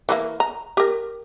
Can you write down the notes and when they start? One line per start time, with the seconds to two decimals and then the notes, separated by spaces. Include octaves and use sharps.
0.09 E3 A3 A#3
0.40 A#5
0.77 G4 A#4